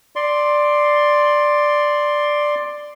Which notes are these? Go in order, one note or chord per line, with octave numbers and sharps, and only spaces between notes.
D5 C6